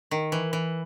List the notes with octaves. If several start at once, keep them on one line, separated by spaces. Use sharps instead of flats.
D#3
E3
E3